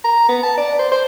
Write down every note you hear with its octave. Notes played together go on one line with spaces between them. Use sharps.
A#5
B3
A5
D5
C5
C5